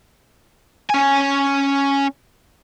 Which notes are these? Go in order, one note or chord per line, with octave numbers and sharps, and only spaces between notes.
C#4 G#5